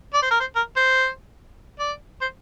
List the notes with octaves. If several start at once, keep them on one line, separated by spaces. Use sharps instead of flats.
D5
C5
A#4
C5
A#4
C5
D5
C5